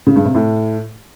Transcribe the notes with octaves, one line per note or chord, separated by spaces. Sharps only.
C#3
G2
C3
A2